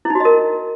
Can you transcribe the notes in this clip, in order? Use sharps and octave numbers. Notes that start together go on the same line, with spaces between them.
E4
D#4
F#4
D#5
A#4